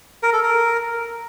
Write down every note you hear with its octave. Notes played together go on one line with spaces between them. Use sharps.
A#4
A4
A#4